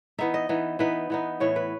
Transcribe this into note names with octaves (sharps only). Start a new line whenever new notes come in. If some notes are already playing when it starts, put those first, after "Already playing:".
E3 B3 D#4 E5
D#5
E3 B3 D#4
E3 B3 D#4 B4
E3 B3 D#4
A2 E3 B3 C#5
B4